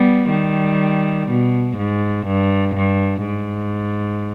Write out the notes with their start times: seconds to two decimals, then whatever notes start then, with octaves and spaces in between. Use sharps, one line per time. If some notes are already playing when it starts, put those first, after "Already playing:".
Already playing: G3 B3
0.30 D#3 G3
1.29 B2
1.77 G#2
2.27 G2
2.75 G2
3.25 G#2